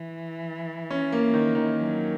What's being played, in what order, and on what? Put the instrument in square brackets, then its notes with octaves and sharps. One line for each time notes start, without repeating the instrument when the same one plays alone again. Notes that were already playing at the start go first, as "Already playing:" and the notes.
Already playing: [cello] E3
[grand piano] C#4
A#3
D#3
D#3
[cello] F#3